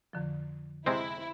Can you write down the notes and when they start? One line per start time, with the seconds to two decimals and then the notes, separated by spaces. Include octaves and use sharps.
0.13 F2 D3 F3
0.86 C3 G#3 C4 E4